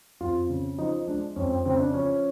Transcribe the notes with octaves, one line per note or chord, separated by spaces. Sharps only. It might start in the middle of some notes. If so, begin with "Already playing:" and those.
F2 F4
C#3
F3 D#4
G#3 D4
F2 C#4
C4
C#3 C4
D4
F3 C#4